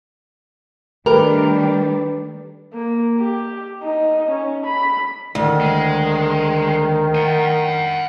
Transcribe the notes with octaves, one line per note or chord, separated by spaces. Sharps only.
D#3 G3 A3 D4 G4 A#4 B4
A#3
G4
D#4
C#4
B5
D2 D#3
G#3
F#5 G#5